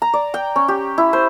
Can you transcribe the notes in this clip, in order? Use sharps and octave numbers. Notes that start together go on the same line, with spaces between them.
A#5
D5
G5
C#4
G4
E4
C5